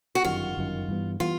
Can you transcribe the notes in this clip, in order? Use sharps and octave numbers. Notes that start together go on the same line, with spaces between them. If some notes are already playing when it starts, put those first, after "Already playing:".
F#4
G1 F#2 D#3 F4
G1 F#2 D#3
G2 E3 G3 B3
E3 G3 B3 F4